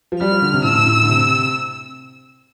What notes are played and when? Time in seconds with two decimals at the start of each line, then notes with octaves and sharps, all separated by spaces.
0.12 F3
0.20 G3 F6
0.31 F3
0.42 D3
0.54 C3
0.64 A2 E6
0.86 A2
1.02 D3
1.09 C3